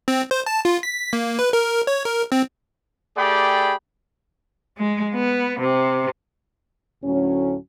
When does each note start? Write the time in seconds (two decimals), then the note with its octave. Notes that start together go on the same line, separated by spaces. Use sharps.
0.08 C4
0.31 C5
0.46 A5
0.65 F4
0.83 B6
1.13 A#3
1.39 B4
1.53 A#4
1.87 C#5
2.05 A#4
2.32 C4
3.17 A3 G4 G#4 D5 G5 B5
4.78 G#3
5.14 B3
5.60 C3
7.04 D2 A2 F#3 C#4